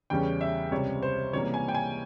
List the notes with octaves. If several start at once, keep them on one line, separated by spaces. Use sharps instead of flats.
E2 C#3 G3 C#4 G5
E5
C#2 C3 G3 C#5
C5
C#2 C3 E3 G3 A#3 C#5
G#5
G5
G#5